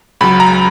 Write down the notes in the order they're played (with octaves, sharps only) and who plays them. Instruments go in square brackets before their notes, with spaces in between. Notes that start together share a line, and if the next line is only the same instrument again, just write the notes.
[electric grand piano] C#2 C#3 F#3 B5
A#5